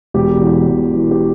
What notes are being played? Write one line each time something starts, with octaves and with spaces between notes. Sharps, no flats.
E1 G4
E2
E1
E3
G4